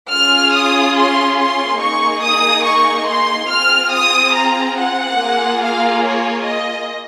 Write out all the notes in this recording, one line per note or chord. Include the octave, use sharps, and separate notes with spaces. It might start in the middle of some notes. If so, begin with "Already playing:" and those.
C#4 F4 G#4 F6
D#6
C6
C6
A#3 D#4 G#4 C#6
D#6
C#6
C6
C4 F4 G#4 F6
D#6
A#5
F#5
A#3 F4 G#4
F5
C#5
D#5